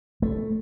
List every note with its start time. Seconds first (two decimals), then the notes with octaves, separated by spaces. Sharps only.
0.22 A3